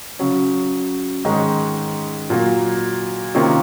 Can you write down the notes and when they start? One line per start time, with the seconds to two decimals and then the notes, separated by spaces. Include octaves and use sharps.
0.19 C#3 F#3 C#4
1.25 G#2 D#3 G#3 C#4
2.30 A#2 F#3 A#3
3.35 C3 D#3 A#3 C#4 F4